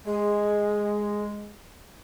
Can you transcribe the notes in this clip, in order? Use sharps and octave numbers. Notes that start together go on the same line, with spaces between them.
G#3 G#4